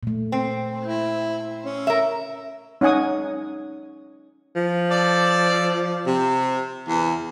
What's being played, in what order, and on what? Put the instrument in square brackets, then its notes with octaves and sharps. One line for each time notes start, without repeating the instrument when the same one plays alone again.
[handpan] A#2 A3
[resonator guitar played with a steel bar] C4
[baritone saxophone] E4
C#4
[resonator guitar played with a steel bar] A#4 E5
[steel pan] C#4 D#4 F#5 G#5 D#6
[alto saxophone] F3
[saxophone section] A4 D5
C3
E2